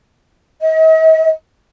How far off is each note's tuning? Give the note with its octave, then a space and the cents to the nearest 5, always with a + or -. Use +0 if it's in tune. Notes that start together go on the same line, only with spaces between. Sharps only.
D#5 +45